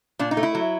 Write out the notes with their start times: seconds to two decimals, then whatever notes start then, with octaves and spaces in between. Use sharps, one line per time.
0.19 A#2 D4
0.31 D#4
0.37 A3
0.43 E4
0.55 F#3